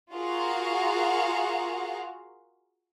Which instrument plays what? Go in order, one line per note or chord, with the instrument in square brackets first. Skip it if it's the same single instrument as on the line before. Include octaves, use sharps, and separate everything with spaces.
[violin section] F4 F#4 G#4 A#4 F5 F#5